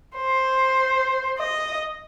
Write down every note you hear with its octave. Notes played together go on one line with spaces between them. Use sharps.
C5
D#5